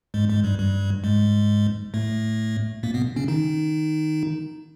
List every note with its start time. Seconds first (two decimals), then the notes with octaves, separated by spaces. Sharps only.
0.14 G#2 G#3
0.29 G#2 G#3
0.44 G2 G3
0.59 G2 G3
1.04 G#2 G#3
1.94 A2 A3
2.83 A#2 A#3
2.94 B2 B3
3.16 C#3 C#4
3.28 D#3 D#4